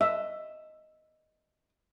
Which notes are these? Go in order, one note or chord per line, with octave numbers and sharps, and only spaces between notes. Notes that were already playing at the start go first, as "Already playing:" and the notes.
D#5 E5